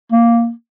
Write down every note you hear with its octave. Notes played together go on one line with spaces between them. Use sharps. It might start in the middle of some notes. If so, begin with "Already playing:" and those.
A#3